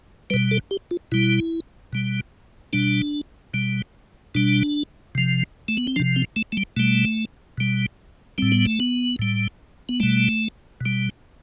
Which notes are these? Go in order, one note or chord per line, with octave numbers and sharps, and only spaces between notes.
B2 G3 B4
A4
G4
F4
B2 G3 E4
B2 G3
B2 G3 D4
B2 G3
B2 G3 D4
C3 F3
A3
B3
C4
C3 F3 D4
C4
A3
A3
G3
B2 G3 A3
B2 G3
A2 G3 C4
B3
A3
B3
A2 G3
B3
B2 G3 A3
B2 G3